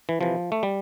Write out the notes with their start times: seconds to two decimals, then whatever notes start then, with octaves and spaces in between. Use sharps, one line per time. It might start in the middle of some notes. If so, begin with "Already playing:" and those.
0.09 E3
0.21 C3 E3 F3
0.52 A3
0.63 G3